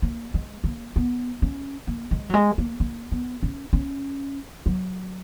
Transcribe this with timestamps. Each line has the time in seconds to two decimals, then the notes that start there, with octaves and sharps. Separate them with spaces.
0.02 A#3
0.34 G#3
0.64 A#3
0.96 B3
1.42 C#4
1.87 A#3
2.11 G#3
2.30 F#3
2.34 G#3
2.58 A#3
2.80 A#3
3.12 B3
3.43 C#4
3.73 C#4
4.66 F#3